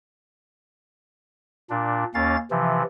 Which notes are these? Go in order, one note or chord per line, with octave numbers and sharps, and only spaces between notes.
A#2 D4
D#2 A#3 C#4 F5 A6
C3 E3 F3